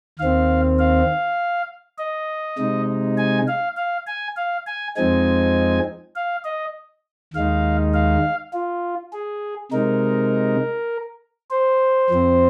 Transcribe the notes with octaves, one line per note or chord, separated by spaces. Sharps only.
D#2 D#3 C4 F5
F5
D#5
C3 G#3 D#4
G#5
F5
F5
G#5
F5
G#5
F2 F3 G#3 C4 D#4 G#5
F5
D#5
D#2 D#3 G#3 D#4 F5
F5
F4
G#4
C3 G#3 D#4 A#4
C5
F2 F3 C4